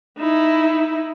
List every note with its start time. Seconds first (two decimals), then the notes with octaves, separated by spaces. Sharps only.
0.18 D#4 E4